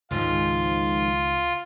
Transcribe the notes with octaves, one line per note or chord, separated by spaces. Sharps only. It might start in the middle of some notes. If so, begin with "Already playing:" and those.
C#2 G#2 D#3 F3 F4